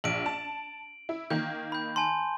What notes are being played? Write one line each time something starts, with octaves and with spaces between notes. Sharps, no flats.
A#1 D7 F#7
A5
E4
D#3 A#3 G6
B5 G6
G#5 A5 C6